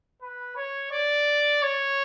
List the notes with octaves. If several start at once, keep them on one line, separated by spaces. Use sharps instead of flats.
B4
C#5
D5
C#5